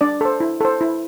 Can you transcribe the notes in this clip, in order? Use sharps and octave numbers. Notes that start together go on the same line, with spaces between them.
D4 D5
A4 C5
E4
A4 C5
E4